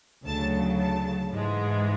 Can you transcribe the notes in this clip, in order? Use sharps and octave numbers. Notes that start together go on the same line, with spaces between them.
D2 C#3 F#3 A5
A5
G#2 E3 G#3